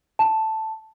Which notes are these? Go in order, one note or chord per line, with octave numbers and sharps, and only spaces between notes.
A5